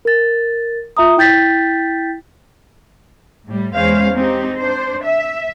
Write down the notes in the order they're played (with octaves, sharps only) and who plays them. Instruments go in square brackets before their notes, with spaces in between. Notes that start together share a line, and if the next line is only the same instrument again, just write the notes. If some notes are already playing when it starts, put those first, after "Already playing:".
[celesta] A#4 A6
F4 E5 A#5 D#6
E4 G5 G6 A6 B6
[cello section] A2 G3
E2 G#3 C#4 C5 F5
G#3 C4 D#4 G4
D4 C5
E5